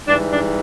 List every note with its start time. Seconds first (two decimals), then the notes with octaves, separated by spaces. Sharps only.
0.07 G#2 E3 G3 D4
0.31 D4